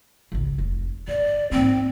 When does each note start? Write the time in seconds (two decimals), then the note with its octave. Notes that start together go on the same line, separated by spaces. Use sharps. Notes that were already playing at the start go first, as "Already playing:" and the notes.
0.32 G#1 C#2
0.58 F1
1.08 G1 D5
1.52 G#2 A#3 C4